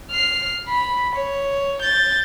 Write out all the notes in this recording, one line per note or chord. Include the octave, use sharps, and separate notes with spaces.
F6 C7
B5
C#5
G6 A6